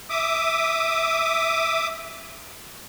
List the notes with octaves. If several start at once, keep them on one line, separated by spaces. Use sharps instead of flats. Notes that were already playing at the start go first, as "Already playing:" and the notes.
E5 D6 D#6